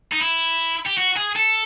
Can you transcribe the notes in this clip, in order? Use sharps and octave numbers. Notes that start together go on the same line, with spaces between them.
D#4
E4
G4
F#4
G#4
A4